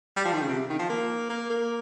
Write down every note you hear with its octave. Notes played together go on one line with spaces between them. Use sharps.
G3
F3
D#3
C#3
C3
D#3
F3
A#3
A#3
A#3